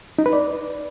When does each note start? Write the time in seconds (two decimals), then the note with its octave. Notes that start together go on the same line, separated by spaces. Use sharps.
0.19 D#4
0.26 B4
0.33 D5